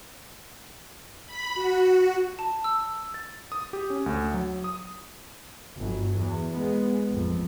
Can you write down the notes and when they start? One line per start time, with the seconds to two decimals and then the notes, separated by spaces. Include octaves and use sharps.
1.26 B5
1.55 F#4
2.39 A5
2.64 E6
3.14 A6
3.52 D#6
3.73 G4
3.90 C#4
4.06 D2
4.34 F#3
4.64 D#6
5.77 G1 F#3
6.18 E2
6.53 G#3 B3
7.10 A1 F2